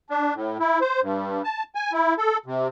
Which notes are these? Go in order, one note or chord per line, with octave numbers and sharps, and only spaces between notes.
D4
A2
E4
C5
G2
A5
G#5
E4
A4
C3